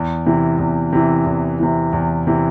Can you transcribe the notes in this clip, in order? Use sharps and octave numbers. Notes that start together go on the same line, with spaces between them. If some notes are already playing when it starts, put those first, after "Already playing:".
Already playing: E2
C3 E3
E2
C3 E3
E2
C3 E3
E2
C3 E3